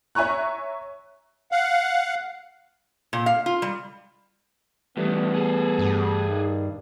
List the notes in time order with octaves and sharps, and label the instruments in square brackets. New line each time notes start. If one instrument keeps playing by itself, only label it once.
[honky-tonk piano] C#5 E5 G#5 A#5 C#6 F#6
[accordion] F5 F#5
[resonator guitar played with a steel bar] A#2
F5
F4
G3
[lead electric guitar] G2 D#3 [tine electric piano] E3 G3 A3 [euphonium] B3
[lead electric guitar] G#4 A4
[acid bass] G2
[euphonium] D#3